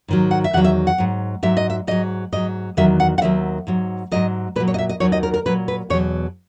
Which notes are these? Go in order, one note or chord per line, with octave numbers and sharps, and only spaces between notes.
G#2 D#3 F#3
F#5
E5
E2 D#3 F#3 F#5
E5
F#5
G#2 F#3
G#2 F#3 E5
D#5
E5
G#2 F#3 D#5
G#2 F#3 D#5
E2 D#3 F#3 E5
F#5
F#5
D#2 D#3 F#3 E5
G#2 F#3
G#2 D#3 F#3 D#5
A#2 F#3 B4
C#5
D#5
E5
D#5
D#2 D#3 F#3 C#5
D#5
A#4
A#4
A#2 F#3 B4
B4
E2 B2 F#3 C#5